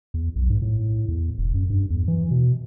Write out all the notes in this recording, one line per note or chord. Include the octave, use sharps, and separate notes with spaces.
E2
B1
G#2
A2
E2
E1
F#2
G2
E2
E3
B2